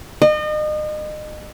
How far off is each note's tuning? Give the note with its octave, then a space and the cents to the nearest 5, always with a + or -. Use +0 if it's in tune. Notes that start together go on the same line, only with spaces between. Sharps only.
D#5 -35